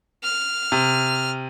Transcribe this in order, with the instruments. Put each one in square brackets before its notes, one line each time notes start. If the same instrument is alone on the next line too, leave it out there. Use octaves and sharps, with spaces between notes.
[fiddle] F6
[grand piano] C3